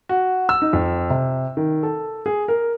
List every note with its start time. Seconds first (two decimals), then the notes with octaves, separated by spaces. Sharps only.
0.09 F#4
0.49 E6
0.62 D#4
0.73 F2
1.10 C3
1.57 D#3
1.83 A4
2.26 G#4
2.48 A#4